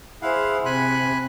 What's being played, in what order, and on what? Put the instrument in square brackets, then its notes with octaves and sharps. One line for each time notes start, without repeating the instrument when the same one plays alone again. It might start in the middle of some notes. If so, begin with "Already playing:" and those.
[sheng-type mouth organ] E4 F5 F#5 [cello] G#4 C5
[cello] C3 [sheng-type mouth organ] G#5 B5 F#6